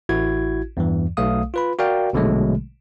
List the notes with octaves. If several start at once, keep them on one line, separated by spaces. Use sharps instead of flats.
A1 E4 F#4 G#6
E2 G2 E3
B1 A3 F5 D#6
F4 B4 B5
F#4 A#4 D5 F5 G5
A#1 B2 D3 F#3 G#3 A3